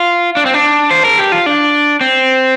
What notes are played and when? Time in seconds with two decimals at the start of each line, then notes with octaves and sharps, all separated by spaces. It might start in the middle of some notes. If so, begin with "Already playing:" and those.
Already playing: F4
0.37 D4
0.46 C4
0.54 D4
0.91 C5
1.05 A#4
1.19 G4
1.32 F4
1.46 D4
2.01 C4